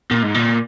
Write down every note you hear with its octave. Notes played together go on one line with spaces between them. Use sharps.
A#2
G#2
A#2